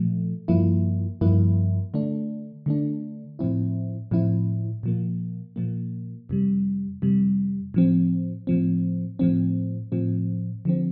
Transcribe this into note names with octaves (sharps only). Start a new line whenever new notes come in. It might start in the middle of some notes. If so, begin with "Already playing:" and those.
Already playing: A#2 F3 A3
G2 F3 A#3 E4
G2 F3 A#3 E4
D3 A3 D4
D3 A3 D4
A2 F3 C4 E4
A2 F3 C4 E4
A#2 F3 A#3
A#2 F3 A#3
F2 C3 G3
F2 C3 G3
A2 F3 C4
A2 F3 C4
A2 F3 C4
A2 F3 C4
D3 F3 C4